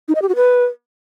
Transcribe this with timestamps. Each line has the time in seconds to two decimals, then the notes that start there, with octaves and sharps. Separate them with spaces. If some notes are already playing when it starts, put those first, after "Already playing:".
0.08 D#4
0.15 D#5
0.22 G4
0.29 F#4
0.36 B4